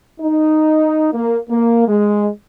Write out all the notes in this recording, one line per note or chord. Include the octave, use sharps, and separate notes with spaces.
D#4
A#3
A#3
G#3